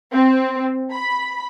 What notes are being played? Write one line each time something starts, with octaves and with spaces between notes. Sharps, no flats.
C4
B5